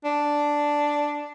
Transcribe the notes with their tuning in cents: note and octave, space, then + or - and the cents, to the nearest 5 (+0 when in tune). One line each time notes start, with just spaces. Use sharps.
D4 +0